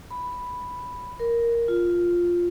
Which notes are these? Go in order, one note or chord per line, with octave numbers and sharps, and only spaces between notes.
B5
A#4
F4